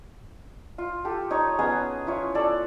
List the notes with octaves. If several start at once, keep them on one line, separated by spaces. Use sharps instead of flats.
F4
G4 A4
D#4 C#5
B3 C#4 G#4 D#5
E4 F4 C#5
A4 D5